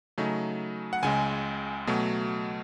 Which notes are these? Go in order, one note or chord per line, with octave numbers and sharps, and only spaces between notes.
C#3 F#3 A3 D#4
F#5
C#2 C#3 G#3 G#5
B2 F#3 A3